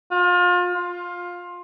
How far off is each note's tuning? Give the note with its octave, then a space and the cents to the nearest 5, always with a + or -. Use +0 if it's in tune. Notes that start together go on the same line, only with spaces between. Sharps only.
F4 +30
F4 +15